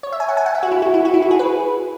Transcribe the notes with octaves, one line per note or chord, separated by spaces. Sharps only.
C#5
E5
G#5
F#5
G#5
F#5
E5
F#4
E4
F#4
E4
F#4
E4
F#4
G#4
B4